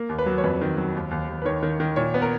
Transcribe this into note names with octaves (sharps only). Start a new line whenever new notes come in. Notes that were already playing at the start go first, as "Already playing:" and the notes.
Already playing: A#3
D#2
B4
F#3
C#5
F2 B4
D#3
F#3
D#2
D#2
D#2
B4
D#3 C#5
D#3
D#3
A#2 C#5
B3
A#4